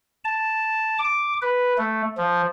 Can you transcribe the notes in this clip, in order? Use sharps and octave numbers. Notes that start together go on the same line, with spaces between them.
A5
D6
B4
A3
F3